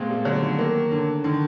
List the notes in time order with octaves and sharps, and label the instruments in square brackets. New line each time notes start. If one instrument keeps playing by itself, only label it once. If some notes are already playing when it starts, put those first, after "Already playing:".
Already playing: [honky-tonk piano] A#2 C4 [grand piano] G#3 A3 B3
[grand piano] G3
[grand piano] D3 [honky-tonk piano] F#3
[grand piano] D#3
[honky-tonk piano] A#3
D3
[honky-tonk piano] D3 [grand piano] D#3